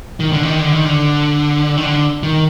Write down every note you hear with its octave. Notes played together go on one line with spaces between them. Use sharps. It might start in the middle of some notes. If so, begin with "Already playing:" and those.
D#3
D3
D#3
D3
D#3
D3
D#3
D3
D#3